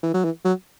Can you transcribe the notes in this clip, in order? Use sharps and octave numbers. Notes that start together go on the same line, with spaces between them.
E3
F#3
E3
F#3